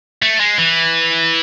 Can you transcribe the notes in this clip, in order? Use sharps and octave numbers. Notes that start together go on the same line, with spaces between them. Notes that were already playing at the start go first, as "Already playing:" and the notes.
A3
G#3
E3